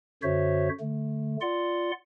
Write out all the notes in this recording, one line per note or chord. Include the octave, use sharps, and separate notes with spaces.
F#2 D3 F#4 C5 C#5 E5
D3 A3
F4 D5 F#5 C6